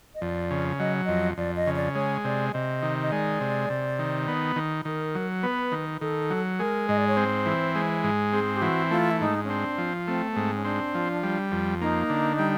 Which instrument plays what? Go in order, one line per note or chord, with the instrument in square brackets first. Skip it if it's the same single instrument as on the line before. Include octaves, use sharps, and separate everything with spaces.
[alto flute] D#5
[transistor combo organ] F2 [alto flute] D5
[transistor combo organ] C#3
[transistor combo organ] F#3 [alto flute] D#5
[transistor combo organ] F2 [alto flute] D#5
[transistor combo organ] F2 [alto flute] D5
[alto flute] D#5
[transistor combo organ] C#3
[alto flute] D5
[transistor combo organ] G#3 [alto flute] C#5
[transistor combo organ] C3 [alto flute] D5
[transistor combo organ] C3 [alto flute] D#5
[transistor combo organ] D#3
[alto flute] D#5
[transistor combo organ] G#3 [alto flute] D5
[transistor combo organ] C3
C3
D#3
B3
D#3
[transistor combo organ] D#3 [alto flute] A#4
[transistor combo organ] F#3
[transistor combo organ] B3 [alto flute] B4
[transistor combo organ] D#3
[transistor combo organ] D#3 [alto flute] A4
[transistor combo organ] F#3
[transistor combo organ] G#3 [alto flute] A#4
[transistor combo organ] G#2 [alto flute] D#5
[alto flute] D5
C#5
[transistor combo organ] C4 [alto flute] C5
[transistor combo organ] E3
G#3
G#2
[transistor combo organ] C4 [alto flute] G#4
[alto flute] G4
[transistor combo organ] E3 [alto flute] F#4
[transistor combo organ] A3 [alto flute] F4
[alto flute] E4
[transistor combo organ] G#2 [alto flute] D#4
[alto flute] C#4
[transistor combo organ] C4 [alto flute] D4
[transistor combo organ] F3
[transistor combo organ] A3 [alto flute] C4
[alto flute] B3
[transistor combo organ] G#2 [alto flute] C4
[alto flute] C#4
[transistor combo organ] C4 [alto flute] D4
[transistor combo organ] F3
G3
F2
[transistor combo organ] A#3 [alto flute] D#4
[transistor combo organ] D3
G3